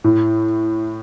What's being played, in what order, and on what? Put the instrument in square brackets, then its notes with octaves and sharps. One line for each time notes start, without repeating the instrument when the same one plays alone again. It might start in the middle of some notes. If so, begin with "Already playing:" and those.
[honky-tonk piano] A2